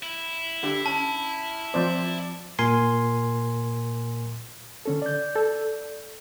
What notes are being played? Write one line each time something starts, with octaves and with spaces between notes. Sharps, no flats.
E4
D3 G4
C#4 A5
F3 C4 C5 D5
A#2 A#4 G#5 C6
D3 C#4 A4
D5 G6
A4